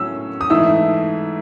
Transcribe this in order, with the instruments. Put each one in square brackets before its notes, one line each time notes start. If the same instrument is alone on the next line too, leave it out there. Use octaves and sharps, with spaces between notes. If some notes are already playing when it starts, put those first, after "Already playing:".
Already playing: [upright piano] A2 F#3 C#4 E6
D#6
G#2 E3 A3 E4 E6